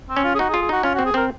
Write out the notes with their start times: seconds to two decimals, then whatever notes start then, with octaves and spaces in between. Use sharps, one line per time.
0.09 C4
0.16 C#4
0.24 F4
0.35 G#4
0.39 D#4 F#4
0.49 G#4
0.54 F4
0.62 G#4
0.69 D#4 F#4
0.83 C#4 F4
0.95 F#4
0.99 C4
1.06 G#4
1.14 C4 A#4